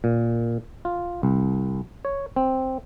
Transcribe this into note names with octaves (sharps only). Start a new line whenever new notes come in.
A#2
F4
C2
C#5
C4